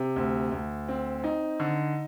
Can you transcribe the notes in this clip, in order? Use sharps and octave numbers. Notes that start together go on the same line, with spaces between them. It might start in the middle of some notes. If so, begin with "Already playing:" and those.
Already playing: C3
D2
D2
C4
D#4
D3